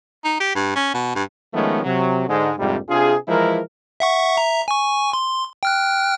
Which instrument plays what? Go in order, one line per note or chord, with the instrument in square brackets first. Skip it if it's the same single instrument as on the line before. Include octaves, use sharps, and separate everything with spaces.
[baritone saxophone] D#4
G4
G2
C#4
B2
G2
[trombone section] D#3 F3 G#3 A3 B3 C#4
C3 F#3
G#2 D3 G#3
A#1 F2 G#2 C3 G3
C3 D4 F4 G#4
E3 F3 G#3 E4 A#4
[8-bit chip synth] E5 F#5 C#6
E5 A#5
G#5 C#6
C6
G5 F6 F#6